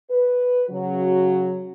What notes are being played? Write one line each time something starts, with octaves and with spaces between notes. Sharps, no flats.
B4
C#3 F#3 F#4